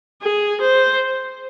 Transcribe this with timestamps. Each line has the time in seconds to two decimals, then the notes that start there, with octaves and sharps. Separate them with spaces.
0.23 G#4
0.61 C5